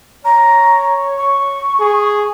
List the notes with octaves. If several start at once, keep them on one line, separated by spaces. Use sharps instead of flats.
C#5 A#5
C#6
G#4